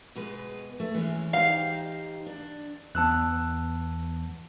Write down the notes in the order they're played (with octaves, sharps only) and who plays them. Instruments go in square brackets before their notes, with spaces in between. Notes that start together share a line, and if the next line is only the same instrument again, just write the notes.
[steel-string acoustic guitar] B2 G#3 B4
A3
E3 G#3 C#4
[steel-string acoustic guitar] D#4 G4 C5 [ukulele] F5
[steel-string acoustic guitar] D4
[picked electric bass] E2 B3 [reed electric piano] A5 E6 F#6